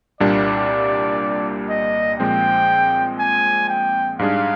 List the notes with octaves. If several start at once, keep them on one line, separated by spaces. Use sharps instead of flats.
C2 A#2 G3 A#3 D4 D5
D#5
A#2 F3 G#3 C4 G5
G#5
G5
G#2 G3 D4 G#4 F5